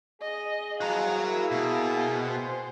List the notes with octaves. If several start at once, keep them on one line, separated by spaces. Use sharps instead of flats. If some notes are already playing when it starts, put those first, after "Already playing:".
G#4 D#5
B2 E3 F3 F#4 F5 A#5
A#3 E4
B2
G5
C5